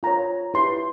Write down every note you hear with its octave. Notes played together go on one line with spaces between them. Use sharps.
F4 A#4 C#5 A#5
E4 G4 B4 C6